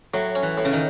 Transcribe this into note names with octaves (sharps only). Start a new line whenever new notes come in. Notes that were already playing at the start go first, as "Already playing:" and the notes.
A2 F#3
C#4
E3
A2
C#3
D#3